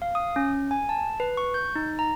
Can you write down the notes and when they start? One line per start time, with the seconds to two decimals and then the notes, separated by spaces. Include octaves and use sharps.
0.02 F5
0.15 D#6
0.36 C#4
0.71 G#5
0.89 A5
1.20 B4
1.37 C#6
1.54 G6
1.76 D#4
1.99 A#5